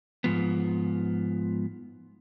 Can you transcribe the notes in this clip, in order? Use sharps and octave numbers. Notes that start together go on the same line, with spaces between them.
G#2 F3 B3